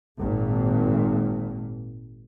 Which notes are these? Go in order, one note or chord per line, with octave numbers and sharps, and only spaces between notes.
G#1 A#2